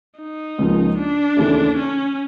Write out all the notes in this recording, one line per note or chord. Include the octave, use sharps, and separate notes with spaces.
D#4
C#2 C#3 F3 A#3
D4
D#2 C#3 E3 A3
C#4